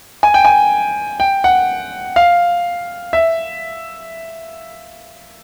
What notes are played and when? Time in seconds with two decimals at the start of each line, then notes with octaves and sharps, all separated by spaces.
0.23 G#5
0.34 G5
0.45 G#5
1.20 G5
1.44 F#5
2.16 F5
3.13 E5